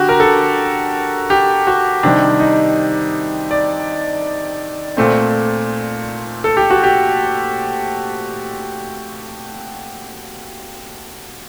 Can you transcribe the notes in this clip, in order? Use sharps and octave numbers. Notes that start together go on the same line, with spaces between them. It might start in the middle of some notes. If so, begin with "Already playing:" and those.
Already playing: D3 F#4 G4
A#4
A4
G4
F#4
C3 D#3 G3 D4
D#4
D5
A#2 A3 C4
A4
G4
F#4
G4